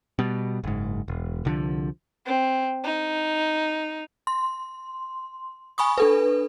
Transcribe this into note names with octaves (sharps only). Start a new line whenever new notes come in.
B2 G3
F#1 G#2
E1
C2 D3 F3
C4
D#4
C6
G#5 B5 C#6 D#6
D4 A4 B4